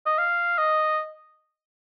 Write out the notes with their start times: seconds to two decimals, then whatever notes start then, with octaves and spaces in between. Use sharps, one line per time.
0.06 D#5
0.18 F5
0.58 D#5